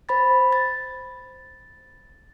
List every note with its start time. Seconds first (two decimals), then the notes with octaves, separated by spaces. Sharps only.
0.09 C5 B5 A6
0.52 A6